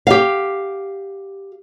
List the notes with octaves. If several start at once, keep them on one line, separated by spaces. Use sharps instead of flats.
G4 F5